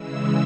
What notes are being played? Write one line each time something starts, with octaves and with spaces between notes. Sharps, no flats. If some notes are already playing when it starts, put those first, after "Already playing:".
Already playing: C#3 E3 G#3 E6